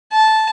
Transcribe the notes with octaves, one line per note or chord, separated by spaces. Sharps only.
A5